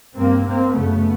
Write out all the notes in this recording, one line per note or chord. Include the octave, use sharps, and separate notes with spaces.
G2 A#3 C4
A#3 C4
F#2 C#3 A3 B3